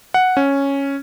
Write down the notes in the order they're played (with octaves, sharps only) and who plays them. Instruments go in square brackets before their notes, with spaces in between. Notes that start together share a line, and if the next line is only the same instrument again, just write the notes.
[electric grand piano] F#5
C#4